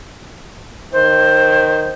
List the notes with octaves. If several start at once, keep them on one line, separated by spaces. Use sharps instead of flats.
D#3 C5